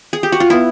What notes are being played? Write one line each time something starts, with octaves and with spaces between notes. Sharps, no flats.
G#4
G4
F#4
F4
B3 E4